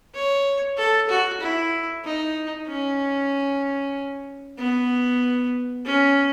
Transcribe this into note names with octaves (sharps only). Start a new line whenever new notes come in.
C#5
A4
F#4
E4
D#4
C#4
B3
C#4